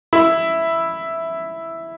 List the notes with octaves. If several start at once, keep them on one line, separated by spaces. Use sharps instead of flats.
E4